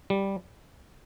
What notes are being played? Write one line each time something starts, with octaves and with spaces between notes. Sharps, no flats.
G3